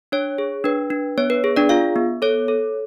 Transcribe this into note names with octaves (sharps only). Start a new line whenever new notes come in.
D4 C#5
G#4
D4 B4
D4
B3 C#5
B4
G#4
D4 D5
F4 F5
B3
A4 C#5
A4